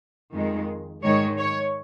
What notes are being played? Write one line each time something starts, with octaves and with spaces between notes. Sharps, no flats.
F2 D#3 G#3
G#2 D#3 G#3 C#5
C#5